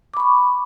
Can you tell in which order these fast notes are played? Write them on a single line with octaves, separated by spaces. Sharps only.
D6 B5 C#6